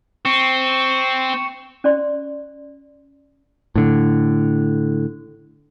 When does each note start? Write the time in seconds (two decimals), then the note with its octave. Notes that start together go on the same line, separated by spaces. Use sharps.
0.25 C4 C#6 C#7 E7
1.84 C#4 D5 C6
3.76 A2 D3